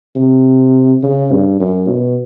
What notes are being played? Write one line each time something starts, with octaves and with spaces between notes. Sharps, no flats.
C3
C#3
G2
F#2
B2